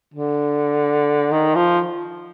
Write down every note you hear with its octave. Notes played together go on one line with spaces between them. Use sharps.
D3
D#3
F3